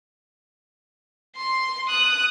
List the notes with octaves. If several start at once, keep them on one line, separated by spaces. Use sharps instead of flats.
C6
D#6 F#6